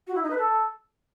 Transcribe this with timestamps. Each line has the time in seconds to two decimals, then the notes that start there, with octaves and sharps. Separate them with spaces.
0.07 F#4
0.15 E4
0.23 D#4
0.30 B4
0.38 A4